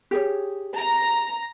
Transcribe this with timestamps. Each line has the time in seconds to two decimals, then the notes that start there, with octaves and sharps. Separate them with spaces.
0.11 G4 G#4 C#5
0.78 A#5